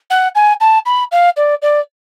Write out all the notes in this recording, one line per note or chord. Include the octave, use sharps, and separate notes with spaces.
F#5
G#5
A5
B5
F5
D5
D5